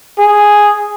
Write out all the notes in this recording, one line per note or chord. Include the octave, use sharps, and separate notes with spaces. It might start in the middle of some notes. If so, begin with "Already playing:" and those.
G#4